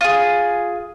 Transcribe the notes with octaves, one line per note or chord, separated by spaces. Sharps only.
F4 G#4